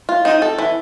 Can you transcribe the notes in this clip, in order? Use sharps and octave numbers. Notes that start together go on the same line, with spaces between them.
F4
C4 D#4
A4
E3